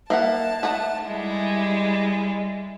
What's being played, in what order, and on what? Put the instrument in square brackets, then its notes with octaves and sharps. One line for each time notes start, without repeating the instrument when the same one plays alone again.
[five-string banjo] A#3 E5 F#5 [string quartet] A5
[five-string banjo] A3 D#4 F#5
[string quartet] G3 G#3 E4